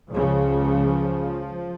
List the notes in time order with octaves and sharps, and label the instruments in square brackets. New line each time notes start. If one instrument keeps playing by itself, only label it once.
[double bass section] C#2 C#3 F3